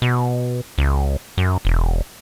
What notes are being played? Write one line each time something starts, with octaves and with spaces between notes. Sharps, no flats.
B2
C#2
F#2
E1